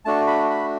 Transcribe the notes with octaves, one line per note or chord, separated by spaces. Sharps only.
A3 D4 F#4 A5
B5
B5